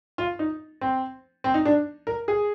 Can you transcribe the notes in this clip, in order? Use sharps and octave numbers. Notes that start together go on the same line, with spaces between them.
F4
D#4
C4
C4
D#4
D4
A#4
G#4